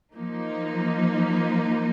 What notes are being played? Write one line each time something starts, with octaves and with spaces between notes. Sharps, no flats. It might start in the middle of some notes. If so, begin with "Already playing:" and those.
F3 A#3 D#4